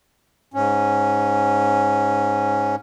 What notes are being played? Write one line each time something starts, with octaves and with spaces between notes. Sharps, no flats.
G#2 C#4